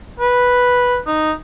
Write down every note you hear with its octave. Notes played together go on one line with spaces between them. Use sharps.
B4
D#4